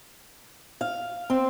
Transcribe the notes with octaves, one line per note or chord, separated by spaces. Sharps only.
F5
C4